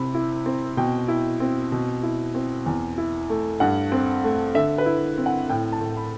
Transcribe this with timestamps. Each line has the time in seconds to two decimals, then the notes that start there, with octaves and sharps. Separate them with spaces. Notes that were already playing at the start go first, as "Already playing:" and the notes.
Already playing: C3 C4 E4 B5
0.15 E4
0.46 C4
0.77 B2 G5
1.08 E4
1.40 C4
1.72 B2
2.03 E4
2.35 C4
2.66 E2
2.98 E4
3.30 A3
3.60 G2 F#5
3.92 C4
4.24 A3
4.55 D3 E5
4.78 B4
4.86 E4
5.18 C4
5.26 F#5
5.50 A2 G5
5.73 A5
5.81 A2
5.97 B5